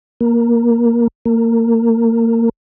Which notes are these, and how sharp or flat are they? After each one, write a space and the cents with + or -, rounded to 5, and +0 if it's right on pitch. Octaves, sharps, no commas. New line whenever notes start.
A#3 +10
A#3 -25